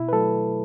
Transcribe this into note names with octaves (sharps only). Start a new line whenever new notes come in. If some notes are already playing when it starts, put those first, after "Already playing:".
Already playing: B2 E4
B4
F#3 A3 A4